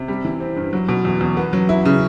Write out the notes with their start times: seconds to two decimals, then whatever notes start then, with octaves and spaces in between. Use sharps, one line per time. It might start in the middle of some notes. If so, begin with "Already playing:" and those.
Already playing: C3
0.08 G3
0.25 E3
0.40 C4
0.56 G2
0.73 F#3
0.89 B2
1.05 E2
1.21 E2
1.37 B3
1.53 F#3
1.69 E4
1.85 C#3